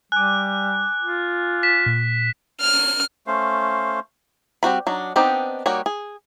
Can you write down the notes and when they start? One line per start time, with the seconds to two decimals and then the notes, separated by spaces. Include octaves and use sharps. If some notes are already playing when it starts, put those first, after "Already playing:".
0.12 G3 G#5 D6 F#6
1.02 F4
1.63 B6 E7
1.86 A#2
2.61 F6
3.27 A3 C#4 C5 F5
4.63 G3 C4 F#4 B5
4.87 F#3 D4 D#4
5.16 B3 C4 D4 D#4 G4
5.66 G3 A#3 D#4 F#4 C#5
5.86 G#4